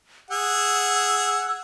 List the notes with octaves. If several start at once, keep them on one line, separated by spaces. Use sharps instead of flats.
G#4 F#5 E6